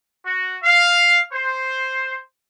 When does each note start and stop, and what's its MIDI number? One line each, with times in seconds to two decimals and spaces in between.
0.25 0.57 66
0.64 1.20 77
1.33 2.18 72